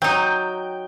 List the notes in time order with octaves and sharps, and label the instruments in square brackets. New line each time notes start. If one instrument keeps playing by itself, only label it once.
[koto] F#3 D#4 [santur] G5